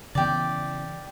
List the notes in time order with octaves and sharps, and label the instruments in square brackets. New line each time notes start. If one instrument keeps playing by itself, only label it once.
[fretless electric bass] C#3 E3 B3 [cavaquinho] G4 D5